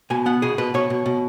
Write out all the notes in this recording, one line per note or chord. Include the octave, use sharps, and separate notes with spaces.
B2 G#5
B3 F#5
B2 G#4
B2 B4
B2 C#5
B2
B2